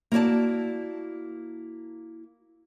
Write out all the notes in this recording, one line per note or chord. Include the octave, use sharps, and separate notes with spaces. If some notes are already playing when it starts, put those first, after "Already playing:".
A#3 E4 F#4 D5 A5